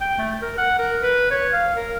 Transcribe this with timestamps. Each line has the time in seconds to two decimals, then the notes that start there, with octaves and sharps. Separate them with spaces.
0.01 G5
0.18 A3
0.42 A#4
0.58 F#5
0.78 A#4
1.02 B4
1.31 C#5
1.53 F5
1.76 A#4